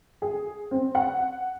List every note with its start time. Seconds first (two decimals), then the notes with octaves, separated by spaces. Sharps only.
0.22 G#4
0.71 C4
0.95 F#5